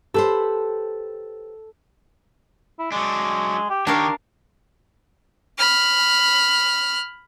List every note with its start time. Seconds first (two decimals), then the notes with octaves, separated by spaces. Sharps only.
0.14 G4 A4 B4 C5
2.79 E4
2.92 F#3 G#3 D4
3.70 G4
3.87 D#3 D4 G4 A#4 C#5 F5
5.58 B5 F6